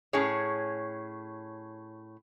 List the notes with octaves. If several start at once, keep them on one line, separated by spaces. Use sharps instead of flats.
A2 C#4 G#4 C#5